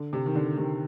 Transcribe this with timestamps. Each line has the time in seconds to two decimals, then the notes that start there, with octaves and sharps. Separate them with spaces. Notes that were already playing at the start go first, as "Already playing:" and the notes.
Already playing: D3
0.13 C3
0.26 D#3
0.35 D3
0.57 C3 D#3